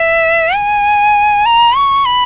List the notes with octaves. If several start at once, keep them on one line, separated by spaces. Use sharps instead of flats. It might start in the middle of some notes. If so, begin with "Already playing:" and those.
Already playing: E5
G#5
A#5
C#6
B5